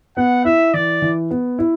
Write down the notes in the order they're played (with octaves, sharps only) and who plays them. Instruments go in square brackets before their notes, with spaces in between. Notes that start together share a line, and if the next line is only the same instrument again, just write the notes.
[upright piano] B3 [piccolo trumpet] F#5
[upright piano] E4 [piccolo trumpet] E5
[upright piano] E3 [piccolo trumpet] D5
[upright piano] E3
B3
E4